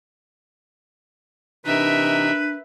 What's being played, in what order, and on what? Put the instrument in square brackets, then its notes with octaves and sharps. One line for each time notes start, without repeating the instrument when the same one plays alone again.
[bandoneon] C3 E3 D#4 [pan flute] D4 [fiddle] A#4 E5 [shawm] B4